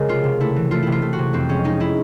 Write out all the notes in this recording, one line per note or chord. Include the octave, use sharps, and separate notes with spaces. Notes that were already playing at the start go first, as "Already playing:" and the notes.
Already playing: C#3 G#3 A#4
C3 F4
C3
A3 E4
E3
A3 F4
C3 E4
F4
A3
F#4
C3
F2 C4
G#3 C#4
G#3 D#4
G#3 E4